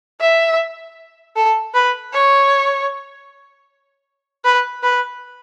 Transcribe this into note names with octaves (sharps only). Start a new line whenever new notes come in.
E5
A4
B4
C#5
B4
B4